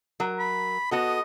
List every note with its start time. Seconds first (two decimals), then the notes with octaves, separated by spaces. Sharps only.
0.20 F#3 A#4
0.39 B5
0.91 B3 F#4 A4 D#5